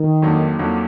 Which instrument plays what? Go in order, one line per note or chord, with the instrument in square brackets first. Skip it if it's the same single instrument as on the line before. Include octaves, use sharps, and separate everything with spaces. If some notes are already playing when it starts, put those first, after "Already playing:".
Already playing: [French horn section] D#3
[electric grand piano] F2 D3 F#3 A#3 D#4
F2 D3 F#3 A#3 D#4